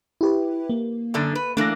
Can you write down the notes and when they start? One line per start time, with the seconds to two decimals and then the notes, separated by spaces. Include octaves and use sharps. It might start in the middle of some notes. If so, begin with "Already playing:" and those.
0.21 E4 G4 B4
0.69 A#3
1.14 F#2 D3 D4
1.35 B4
1.57 E3 A3 A#3 D4 F#6 A#6